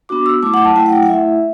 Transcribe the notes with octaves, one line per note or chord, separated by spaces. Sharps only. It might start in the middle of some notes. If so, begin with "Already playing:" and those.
B3 D4 F#4 D6
E6
F#3 A3 E4 D6
F#5
A5
F#3 A3 E4 G5
F#5
G5
F#5
A3 E4 E5